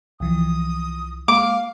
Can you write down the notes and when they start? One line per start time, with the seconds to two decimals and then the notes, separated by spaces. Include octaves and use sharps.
0.20 C2 E3 F3 D#6
1.28 G#3 A#3 F5 D6